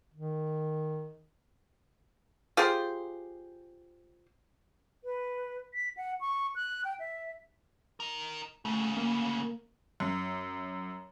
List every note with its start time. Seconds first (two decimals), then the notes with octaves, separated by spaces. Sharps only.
0.14 D#3
2.57 F4 G4 G#4 C5
5.04 B4
5.74 B6
5.97 F#5
6.21 C#6
6.56 F#6
6.85 G5
7.00 E5
8.00 D#4 A#4
8.65 D2 C#3 A3
8.97 A#3
10.00 F#2